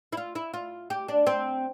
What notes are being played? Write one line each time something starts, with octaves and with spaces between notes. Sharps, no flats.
E4
F4
E4
F4
G4
D4
C4